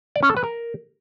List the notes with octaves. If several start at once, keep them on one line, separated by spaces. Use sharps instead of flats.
D5
C#4
A4
B4
A#4